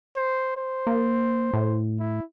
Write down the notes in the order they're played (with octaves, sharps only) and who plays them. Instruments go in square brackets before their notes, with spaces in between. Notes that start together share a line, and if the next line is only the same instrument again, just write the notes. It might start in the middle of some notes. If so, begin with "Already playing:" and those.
[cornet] C5
C5
[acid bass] A#3
A2
[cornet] E4